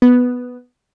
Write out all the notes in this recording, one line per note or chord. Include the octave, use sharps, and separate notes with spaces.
B3